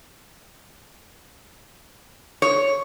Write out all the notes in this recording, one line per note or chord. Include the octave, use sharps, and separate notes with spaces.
C#5